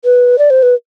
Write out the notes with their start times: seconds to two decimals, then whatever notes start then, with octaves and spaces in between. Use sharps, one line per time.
0.05 B4
0.38 D5
0.50 C5
0.63 B4